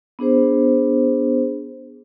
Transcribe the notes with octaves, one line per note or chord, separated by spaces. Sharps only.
B3 D4 G#4 C5